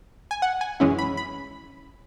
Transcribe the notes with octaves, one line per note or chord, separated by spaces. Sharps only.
G#5
F#5
G#5
F#2 E3 G#3 C#4 E4
B5
B5